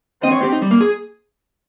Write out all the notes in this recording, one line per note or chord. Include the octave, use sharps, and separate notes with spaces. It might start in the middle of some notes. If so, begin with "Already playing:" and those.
C4 D#5
C#5
G4
D#4
G3
A#3
G#4